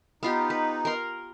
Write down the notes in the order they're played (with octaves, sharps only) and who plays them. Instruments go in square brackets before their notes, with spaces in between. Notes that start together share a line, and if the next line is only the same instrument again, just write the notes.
[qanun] B3 F4 G4 [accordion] D#4
[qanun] B4
A#4 C6